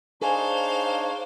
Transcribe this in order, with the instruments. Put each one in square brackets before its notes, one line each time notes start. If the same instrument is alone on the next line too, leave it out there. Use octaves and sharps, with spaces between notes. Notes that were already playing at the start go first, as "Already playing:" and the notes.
[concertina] D4 D#4 C#5 [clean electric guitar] G#4 [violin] C5 F5